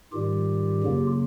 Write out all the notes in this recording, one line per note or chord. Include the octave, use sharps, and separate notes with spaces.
G#2 D#3 G3 F4 G4
F#2 C#3 F#3 A#3